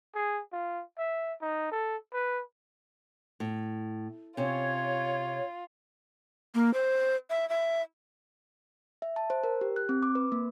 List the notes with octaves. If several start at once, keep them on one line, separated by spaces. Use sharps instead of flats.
G#4
F4
E5
D#4
A4
B4
A2
C3 C#4 F4 C#5
A#3
C5
E5
E5
E5
A5
C5
A#4
G4
F#6
C4
D6
B4
A#3